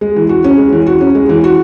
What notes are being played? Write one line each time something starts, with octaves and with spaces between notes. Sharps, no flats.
G#3
E3
F#4
C#4
G#3
E3
F#4
C#4
G#3
E3
F#4